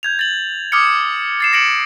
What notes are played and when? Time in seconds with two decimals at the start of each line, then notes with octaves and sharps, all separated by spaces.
0.03 G6 G#6 F7
0.19 A6 F#7
0.72 D6 D#6 F6 G#6 C#7
1.40 A6 C7 E7
1.53 A#6 C#7 D7 F#7